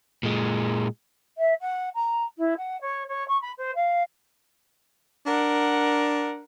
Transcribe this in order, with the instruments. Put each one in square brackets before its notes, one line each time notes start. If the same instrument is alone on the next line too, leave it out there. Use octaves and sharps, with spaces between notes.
[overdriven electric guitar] A#2 G#3
[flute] E5
F#5
A#5
E4
F#5
C#5
C#5
C#6
B5
C5
F5
[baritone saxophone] D4 [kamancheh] A#4 F#5